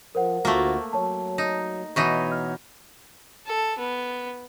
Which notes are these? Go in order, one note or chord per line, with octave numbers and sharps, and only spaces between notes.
F3 A#4 C5 F#5
D2 A3 A#3 F4 F#4
F#3 C#5 A5
D#4
B2 E3 B3 D#4 C#5 C#6 D#7
F6
A4
B3